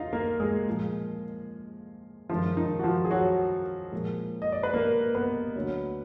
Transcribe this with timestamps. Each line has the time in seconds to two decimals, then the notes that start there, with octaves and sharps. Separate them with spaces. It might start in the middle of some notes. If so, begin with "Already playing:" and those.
Already playing: D#2 D#4 F4 D#5 F5
0.13 A#3 A#4
0.40 G#3 G#4
0.67 A#2 F3 G#3
2.29 F#2 D#3 F3 G#3 F4
2.57 D#3 D#4
2.79 F#4
2.84 F3 F4
3.05 G#4
3.11 F#3 F#4
3.92 A#2 F3 G#3
4.42 D#5
4.52 D5
4.63 B4
4.74 A#3 A#4
5.15 B3 B4
5.56 D2 D3 F#3